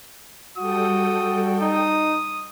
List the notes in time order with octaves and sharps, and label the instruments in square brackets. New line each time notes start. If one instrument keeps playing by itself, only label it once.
[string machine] G3 A4 G5 [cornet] F#4 [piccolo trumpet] D#6
[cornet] D#4 [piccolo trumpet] D#6